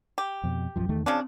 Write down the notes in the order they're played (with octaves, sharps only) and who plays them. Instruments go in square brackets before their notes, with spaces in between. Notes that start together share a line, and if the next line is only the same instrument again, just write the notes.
[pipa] G4
[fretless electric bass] F2 B2
A#1 F#2 F3
E2 D#3 A3
[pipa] C#3 F3 D4 [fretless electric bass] C4